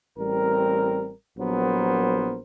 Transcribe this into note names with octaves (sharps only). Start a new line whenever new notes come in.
A1 G3 C4 A#4
A#1 F#3 B3 A#4 C5